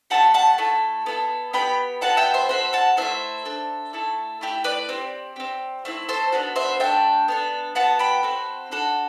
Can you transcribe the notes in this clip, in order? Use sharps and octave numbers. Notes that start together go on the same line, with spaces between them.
A3 C4 G4 F#5 A5
F#5 A5
A3 E4 A4
B3 E4 A4
B3 D4 G4 G5 B5
B3 F#4 A4 F#5 A5
E5 G5
C5 E5
C4 F#4 A4 C5 E5
F#5 A5
A3 C4 E4 C5 E5
D4 A4
A3 E4 A4
A3 E4 G4
B4 D5
C4 G4
C4 G4
A3 C4 E4
A4 C5
B3 D4 F#4 A4
C5 E5
A3 D4 A4 E5 G5
B3 D4 A4
B3 F#4 A4 F#5 A5
G5 B5
C4 F#4 A4
D4 F#4 A4